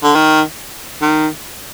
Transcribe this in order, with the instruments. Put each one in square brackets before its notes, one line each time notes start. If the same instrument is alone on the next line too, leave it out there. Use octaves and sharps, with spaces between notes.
[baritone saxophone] D3
D#3
D#3